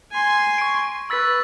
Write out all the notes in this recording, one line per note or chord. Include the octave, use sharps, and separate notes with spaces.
G#5 C6
C#6 D7
B4 E6 A6 B6